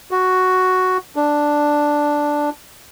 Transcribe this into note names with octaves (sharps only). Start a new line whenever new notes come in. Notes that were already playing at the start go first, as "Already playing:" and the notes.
F#4
D4